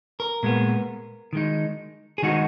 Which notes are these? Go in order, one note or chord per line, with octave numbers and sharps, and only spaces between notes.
A#4
A#2 G#3 B3
D#3 G#3 D#4
G#4
D#3 G#3 D#4 F#4